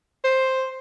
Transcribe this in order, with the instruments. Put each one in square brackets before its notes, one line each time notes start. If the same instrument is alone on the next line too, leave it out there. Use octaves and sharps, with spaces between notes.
[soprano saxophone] C5